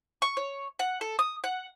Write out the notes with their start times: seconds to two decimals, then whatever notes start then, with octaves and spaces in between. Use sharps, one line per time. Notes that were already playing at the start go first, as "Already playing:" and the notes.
0.22 C#6
0.37 C#5
0.79 F#5
1.01 A4
1.19 D#6
1.44 F#5